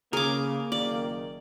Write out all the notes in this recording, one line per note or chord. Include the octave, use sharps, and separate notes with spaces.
C#3 A#3 G#4 A#4 D6
F#1 D#3 D5